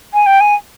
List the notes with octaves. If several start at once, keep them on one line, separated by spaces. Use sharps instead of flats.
G#5
G5
G#5